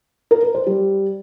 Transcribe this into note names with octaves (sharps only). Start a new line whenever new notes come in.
A#4
B4
C5
G3